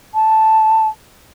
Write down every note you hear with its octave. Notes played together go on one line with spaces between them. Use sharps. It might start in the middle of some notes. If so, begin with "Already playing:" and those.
A5